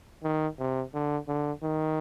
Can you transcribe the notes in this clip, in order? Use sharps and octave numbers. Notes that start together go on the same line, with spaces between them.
D#3
C3
D3
D3
D#3